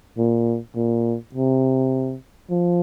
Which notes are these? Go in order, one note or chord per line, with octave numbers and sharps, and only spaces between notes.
A#2
A#2
C3
F3